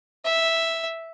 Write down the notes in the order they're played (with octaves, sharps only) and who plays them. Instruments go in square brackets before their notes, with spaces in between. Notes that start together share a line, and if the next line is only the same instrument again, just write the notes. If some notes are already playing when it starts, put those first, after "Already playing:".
[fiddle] E5